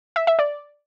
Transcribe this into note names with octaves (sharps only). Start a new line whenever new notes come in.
E5
E5
D5